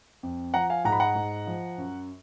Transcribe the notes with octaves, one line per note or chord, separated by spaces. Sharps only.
F2
F3 F#5 A#5
F5 G#5
G#2 F#5 A#5
B5
F#5 A#5
G#2
F3
F#2